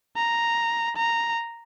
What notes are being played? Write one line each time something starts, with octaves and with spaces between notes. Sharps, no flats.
A#5
A#5